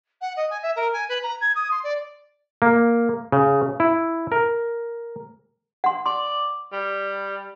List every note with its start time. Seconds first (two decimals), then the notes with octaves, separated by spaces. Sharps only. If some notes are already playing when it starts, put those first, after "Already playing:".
0.21 F#5
0.36 D#5
0.50 G#5
0.62 E5
0.76 A#4
0.93 G#5
1.09 B4
1.23 A#5
1.40 G#6
1.55 D#6
1.71 C6
1.83 D5
2.62 A#3
3.32 C#3
3.80 E4
4.32 A#4
5.84 F#5 C6
6.06 D5 C6
6.72 G3